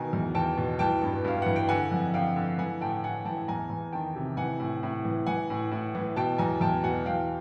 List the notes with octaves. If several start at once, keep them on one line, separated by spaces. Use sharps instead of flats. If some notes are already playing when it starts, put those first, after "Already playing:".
Already playing: B2 D#3 G#5 A#5
E2
E2 G5 A5
B2
E3 G5 A5
G2
G2 F5
E3 F#5
G5
D3 F#5 G#5
F2
F2 F5 G5
D3
E3 F#5 G#5
A2 G5 A5
A2 F#5 G#5
E3 G5 A5
E2 G#5 A#5
E2
D#3 G5 A5
C3
E3 F#5 G#5
A2
A2
E3
E3 F#5 G#5
A2
A2
E3
B2 G5 A5
E2 G#5 A#5
E2 G5 A5
B2 F#5 G#5
E3 F5 G5